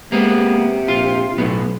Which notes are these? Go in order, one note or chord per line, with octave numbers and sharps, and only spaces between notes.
C3 G#3 A#3 B3
A#1 F4
B1 A2 B3